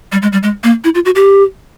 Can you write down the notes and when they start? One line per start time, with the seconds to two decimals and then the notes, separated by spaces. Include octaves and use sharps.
0.12 G3
0.22 G#3
0.32 G3
0.43 G#3
0.64 A#3
0.84 E4
0.95 F4
1.05 F#4
1.15 G4